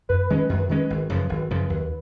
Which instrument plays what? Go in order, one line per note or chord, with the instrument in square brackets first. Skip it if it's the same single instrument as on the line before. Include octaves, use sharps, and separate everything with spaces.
[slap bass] F#2 [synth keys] B4
[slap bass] D#3 G#3 C#4
F#2
D#3 G#3 C#4
G#1
F#2 C#3 F3
G#1
F#2 C#3 F3
D#2